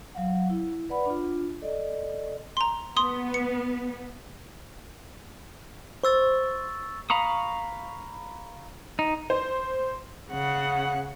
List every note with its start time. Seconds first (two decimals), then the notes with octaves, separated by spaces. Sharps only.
0.15 F#3 F5 F#5
0.50 E4
0.89 B4 D5 F#5 B5
1.05 D4 F4
1.62 A4 D5 D#5
2.57 A#5 C6
2.97 B3 C6 D#6
3.34 C#7
6.03 C5 C#6 E6 A6
7.10 F5 A#5 B5 C#6 D#6
8.99 D#4
9.30 C5
10.32 C#3 F#5